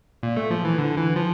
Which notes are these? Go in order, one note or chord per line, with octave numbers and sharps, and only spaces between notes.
A#2
A3
F3
E3
D3
E3
F3